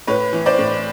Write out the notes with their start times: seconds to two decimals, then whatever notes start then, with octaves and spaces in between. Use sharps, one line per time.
0.07 A2 B4 C#5
0.33 E3
0.46 C5 D5
0.59 A2